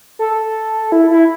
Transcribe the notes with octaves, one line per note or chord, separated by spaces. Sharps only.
A4
E4
E4